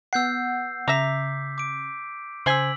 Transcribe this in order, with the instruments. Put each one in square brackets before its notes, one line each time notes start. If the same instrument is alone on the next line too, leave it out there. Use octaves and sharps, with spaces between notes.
[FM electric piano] B3 F#5 [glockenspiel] E6 G6 C7
[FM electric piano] C#3 [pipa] E5 A#5 [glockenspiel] D6 B6
[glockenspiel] D6 D7
[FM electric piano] C#3 [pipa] C5 G#5 [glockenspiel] E6 B6 F#7